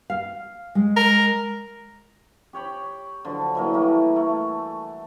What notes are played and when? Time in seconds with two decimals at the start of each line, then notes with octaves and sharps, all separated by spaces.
0.10 F5
0.75 G#3
0.96 A#4
2.53 G4 C#5 G5 B5
3.25 D3 F3 F#3
3.55 E3 F#3 A#3
3.74 E3 G3 A3 A#3
4.16 A3